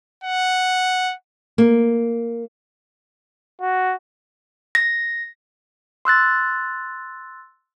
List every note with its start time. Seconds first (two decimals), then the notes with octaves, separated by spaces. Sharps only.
0.24 F#5
1.58 A#3
3.61 F#4
4.75 A#6
6.05 C6 E6 F#6 A6